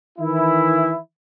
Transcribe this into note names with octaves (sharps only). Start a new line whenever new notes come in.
D#3 E3 E4